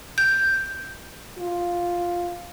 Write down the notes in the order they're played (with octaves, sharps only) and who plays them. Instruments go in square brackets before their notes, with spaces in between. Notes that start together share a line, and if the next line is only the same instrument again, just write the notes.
[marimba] G6
[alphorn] F4